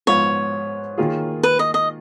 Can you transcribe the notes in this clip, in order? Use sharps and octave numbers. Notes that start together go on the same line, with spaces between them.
G#2 F3 B3 F4 B4 C#5
D#3 A#3 F4 G#4
B4
D#5
D#5